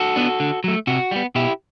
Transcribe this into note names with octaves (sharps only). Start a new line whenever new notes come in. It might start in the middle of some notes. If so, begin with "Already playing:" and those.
Already playing: F#4 A4
B3 D4
D3
F#3 A3
C3 F#4
G3 B3
B2 E4 G4